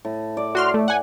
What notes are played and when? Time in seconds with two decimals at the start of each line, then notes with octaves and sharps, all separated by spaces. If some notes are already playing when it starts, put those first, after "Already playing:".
0.05 A2
0.37 D5
0.55 F#4 C6 F6
0.74 A3
0.88 F#5 G#5